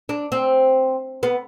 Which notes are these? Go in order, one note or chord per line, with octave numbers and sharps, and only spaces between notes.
D4
C4
B3